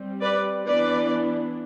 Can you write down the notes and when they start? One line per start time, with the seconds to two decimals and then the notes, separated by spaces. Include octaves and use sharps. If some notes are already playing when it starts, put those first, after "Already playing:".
Already playing: G3 C4
0.22 B4 D5
0.67 E3 B3 D4 B4 D5